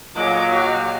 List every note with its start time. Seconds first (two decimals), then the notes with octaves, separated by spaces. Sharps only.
0.16 A#2 F#3 G#4 D#5 D6
0.52 F#4 G4 F5